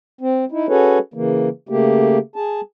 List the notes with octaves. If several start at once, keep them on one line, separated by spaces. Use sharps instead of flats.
C4
D#4 E4
C#4 F#4 G#4 A4 B4 C#5
C#3 E3 A#3
C#3 A3 A#3 G4
G#4 A5